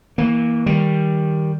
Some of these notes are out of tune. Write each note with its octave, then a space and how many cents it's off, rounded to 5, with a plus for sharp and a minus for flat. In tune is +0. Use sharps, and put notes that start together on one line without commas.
E3 -25 A#3 +5
D#3 +15 G3 +0